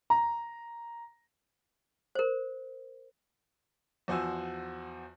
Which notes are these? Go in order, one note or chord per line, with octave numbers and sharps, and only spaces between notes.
A#5
A#4 C5
E2 F3 F#4 C5 G#5 E6